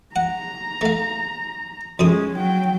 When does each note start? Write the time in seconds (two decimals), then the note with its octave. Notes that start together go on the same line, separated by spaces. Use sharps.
0.16 F#5 A#5
0.81 A3 F5
1.99 F2 C3 G#3 C#4 D#6
2.36 F#3 G5